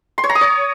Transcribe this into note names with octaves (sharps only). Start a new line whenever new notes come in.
C6
C#5
A#5
D#6
C#5